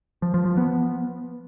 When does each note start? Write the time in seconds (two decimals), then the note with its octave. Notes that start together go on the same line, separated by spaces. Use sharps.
0.22 F3
0.34 F3
0.46 F3
0.57 B3